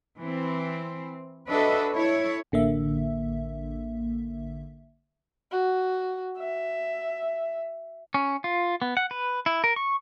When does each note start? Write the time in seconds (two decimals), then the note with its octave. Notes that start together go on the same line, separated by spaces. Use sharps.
0.18 E3 C4
1.49 D4 F#4 A4 B4 D#5 E5
1.93 E4 A4 C#5
2.52 A1 D3 A#3 E5
5.52 F#4
6.38 E5
8.14 C#4
8.44 F4
8.82 B3
8.97 F#5
9.11 B4
9.46 E4
9.64 A#4
9.76 C#6